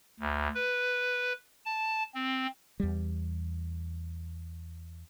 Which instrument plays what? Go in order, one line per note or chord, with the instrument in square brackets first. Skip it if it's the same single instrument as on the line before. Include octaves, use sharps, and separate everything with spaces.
[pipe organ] D2
B4
A5
C4
[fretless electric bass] E2 G3